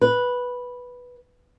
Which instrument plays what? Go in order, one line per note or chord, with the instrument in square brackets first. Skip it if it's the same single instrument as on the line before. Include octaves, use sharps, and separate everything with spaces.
[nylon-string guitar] B4